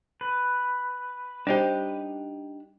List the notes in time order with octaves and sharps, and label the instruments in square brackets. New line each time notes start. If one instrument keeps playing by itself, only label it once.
[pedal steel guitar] B4
[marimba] G3 C5 [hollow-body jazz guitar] D4 D#4 G4